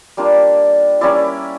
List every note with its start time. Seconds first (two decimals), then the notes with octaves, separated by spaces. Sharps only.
0.17 G3 A#3 D4 F4
1.01 G3 A#3 C#4 E4 D5